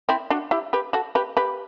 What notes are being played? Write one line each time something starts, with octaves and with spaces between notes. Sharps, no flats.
C4 E4
D4 F#4
E4 G4
G4 B4
F#4 A4
G4 B4
G4 B4